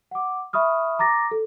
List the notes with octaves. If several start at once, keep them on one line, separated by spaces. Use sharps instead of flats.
F#5 D6
E5 B5 C#6 D#6 F6
A#5 D6 A6 A#6
A4